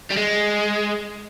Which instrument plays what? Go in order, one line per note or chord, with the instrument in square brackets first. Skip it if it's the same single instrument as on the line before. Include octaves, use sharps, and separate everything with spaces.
[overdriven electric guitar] G3
G#3